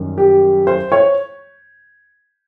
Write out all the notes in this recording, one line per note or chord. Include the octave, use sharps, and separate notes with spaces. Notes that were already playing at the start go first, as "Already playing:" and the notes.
Already playing: F#2 D#3 G3
G4
C5
C#5